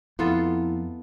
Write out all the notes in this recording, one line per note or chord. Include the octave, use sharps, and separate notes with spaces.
F2 B3 E4 F4 A4